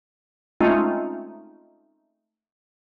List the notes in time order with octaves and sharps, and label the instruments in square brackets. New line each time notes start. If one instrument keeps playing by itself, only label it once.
[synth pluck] G#3 A3 C4 C#4 D#4 F4